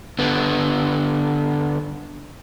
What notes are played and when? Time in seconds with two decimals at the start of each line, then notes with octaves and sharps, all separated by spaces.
0.19 D3 B3